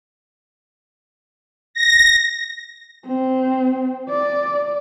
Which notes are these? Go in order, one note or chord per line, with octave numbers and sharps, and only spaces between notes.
A#6
C4
D5